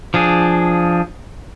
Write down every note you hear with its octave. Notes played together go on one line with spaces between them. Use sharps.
F3 D4 G#4